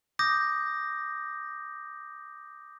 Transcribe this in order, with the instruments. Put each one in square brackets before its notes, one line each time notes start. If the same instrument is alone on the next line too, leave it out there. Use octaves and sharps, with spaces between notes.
[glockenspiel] D6 D#6 G6 A#6